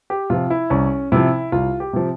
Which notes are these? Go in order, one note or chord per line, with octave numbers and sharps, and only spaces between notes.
G4
C3 F3 F4
E4
C2 C#4
C3 F3 E4
C2 F4
G4
C3 F3